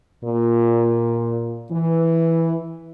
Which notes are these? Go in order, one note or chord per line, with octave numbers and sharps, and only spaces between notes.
A#2
E3